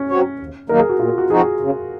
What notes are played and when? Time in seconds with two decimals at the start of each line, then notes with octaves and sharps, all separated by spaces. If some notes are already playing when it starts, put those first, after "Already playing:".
Already playing: C#4
0.09 F#3 C4 F#4 C#5
0.39 D#2
0.69 D#3 F#3 A#3 D#4 A#4
0.79 G#4
0.90 F#4
0.99 A#2 F4
1.18 F#4
1.30 F3 C4 D#4 F#4 G#4
1.60 C#3